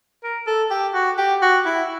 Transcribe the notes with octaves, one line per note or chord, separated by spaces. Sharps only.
A#4
A4
G4
F#4
G4
F#4
E4